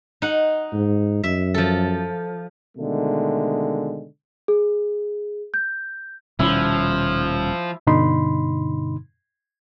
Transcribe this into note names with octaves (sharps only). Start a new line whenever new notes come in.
D#4 F#5
G#2
F#2 E5
F3 A4
B2 D3 D#3 G#3 A3
G#4
G6
D#1 B2 D#3 F3 G3 C#4 E4
G2 B2 D3 D#4 B5 C6